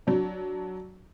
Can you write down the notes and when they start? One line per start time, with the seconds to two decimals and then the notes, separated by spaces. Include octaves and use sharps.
0.07 F#3 D4